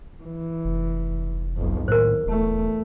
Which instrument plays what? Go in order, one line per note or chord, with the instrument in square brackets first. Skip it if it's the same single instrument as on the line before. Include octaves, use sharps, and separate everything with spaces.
[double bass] E3
[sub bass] F1
[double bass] B1 F2
[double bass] D#2 [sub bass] A2 [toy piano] A#4 C5
[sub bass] D#1 [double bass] E2 A3